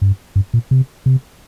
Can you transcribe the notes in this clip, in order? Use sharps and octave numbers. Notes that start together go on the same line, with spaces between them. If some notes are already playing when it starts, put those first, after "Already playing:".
G2
G2
A#2
C3
C3